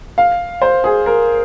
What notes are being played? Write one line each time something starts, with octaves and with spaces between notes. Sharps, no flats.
F5
C5
G#4
A#4